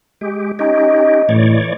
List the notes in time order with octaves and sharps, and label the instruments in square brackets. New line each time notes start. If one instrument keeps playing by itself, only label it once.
[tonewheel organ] G#3 G4
[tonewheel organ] C#4 D#4 G4 [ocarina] D#5
[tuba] A2 [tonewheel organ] E3 C#5 D5